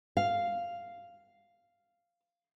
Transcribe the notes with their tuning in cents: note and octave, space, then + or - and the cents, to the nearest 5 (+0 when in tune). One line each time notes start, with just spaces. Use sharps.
F5 -5